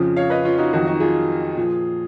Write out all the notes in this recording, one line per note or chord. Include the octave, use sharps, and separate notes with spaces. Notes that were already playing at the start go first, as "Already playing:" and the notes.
Already playing: F2 C#3 F3
C#5 F5
B4 D#5
C#4 F4
D#4 F#4
F2 D#3 F#3 D#4 F#4
D#4 F#4
F4 G#4
A#2 F3